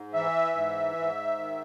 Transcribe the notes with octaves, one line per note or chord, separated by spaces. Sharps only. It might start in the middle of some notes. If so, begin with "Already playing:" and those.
Already playing: G#2
E3 E5
G#2
G#2
D#3